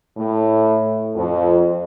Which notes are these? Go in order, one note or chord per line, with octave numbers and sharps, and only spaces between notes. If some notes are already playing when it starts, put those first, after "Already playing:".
A2
F2